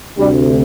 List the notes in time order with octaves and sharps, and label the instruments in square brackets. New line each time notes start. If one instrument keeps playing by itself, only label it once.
[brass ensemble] D2 C3 G3